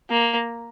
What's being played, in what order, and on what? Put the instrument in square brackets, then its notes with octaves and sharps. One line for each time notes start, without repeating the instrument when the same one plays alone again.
[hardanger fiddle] A#3